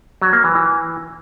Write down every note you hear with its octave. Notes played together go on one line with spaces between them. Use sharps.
F#3
A#3
E3
E3